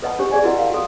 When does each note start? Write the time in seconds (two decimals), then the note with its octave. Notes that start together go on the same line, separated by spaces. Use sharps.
0.02 A4 B4 D#5 F#5 A5 B5
0.19 D4 G4 C5
0.31 G#4 D5 G#5
0.44 E4 F#4 A#4 D#5 F#5
0.59 F5 A5
0.71 F#4 A4